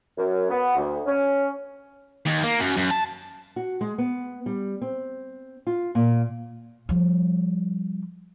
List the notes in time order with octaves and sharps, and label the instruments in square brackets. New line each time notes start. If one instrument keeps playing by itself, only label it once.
[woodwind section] F#2
B3
D2
C#4
[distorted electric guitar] D#2
A#3
F#2
F#2
A5
[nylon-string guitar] F#4
G#3
B3
G3
C4
F4
A#2
[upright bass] F3 G3